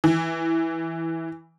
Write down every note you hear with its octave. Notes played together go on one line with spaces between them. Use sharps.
E3